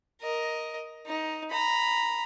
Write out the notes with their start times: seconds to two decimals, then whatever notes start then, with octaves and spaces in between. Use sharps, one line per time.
0.21 A#4 D#5
1.06 D#4
1.51 A#5 B5